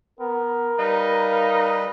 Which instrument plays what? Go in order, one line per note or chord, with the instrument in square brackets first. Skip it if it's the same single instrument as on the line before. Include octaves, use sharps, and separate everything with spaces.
[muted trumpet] B3 [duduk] A#4
[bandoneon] G3 B4 D#5 [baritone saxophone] D#4 [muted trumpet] F5